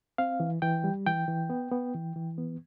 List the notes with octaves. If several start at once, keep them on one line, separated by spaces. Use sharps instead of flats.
C4 F5
E3
E3 G5
G3
E3 G5
E3
B3
B3
E3
E3
B3